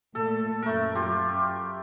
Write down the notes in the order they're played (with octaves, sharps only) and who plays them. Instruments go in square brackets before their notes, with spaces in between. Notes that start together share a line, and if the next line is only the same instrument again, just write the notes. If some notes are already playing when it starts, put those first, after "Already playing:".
[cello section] A#2 A3 [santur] A4
[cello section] F#2 [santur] A3 A#4
[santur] F4 G4